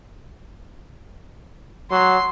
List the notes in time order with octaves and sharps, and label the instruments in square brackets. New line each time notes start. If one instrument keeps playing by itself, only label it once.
[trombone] F#3 [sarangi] C6